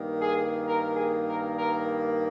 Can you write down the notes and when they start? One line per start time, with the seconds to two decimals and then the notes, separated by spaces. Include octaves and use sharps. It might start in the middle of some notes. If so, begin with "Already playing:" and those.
Already playing: G2 D#3 A#3
0.21 G#4
0.66 A#4
0.96 G#4
1.27 A#4
1.57 A#4